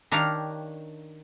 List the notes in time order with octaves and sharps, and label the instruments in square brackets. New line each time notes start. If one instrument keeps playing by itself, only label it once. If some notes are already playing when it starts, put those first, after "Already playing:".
[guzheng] D#3 D4 G4 C#5 F5 A#5